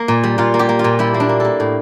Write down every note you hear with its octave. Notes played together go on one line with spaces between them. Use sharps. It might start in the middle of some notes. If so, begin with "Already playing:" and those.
Already playing: A#3
A#2
G3
A#2 F4
A#3
G4
A#3
F4
A#2
G3 E4
A#3
D4
A#3
A#3 A4
A2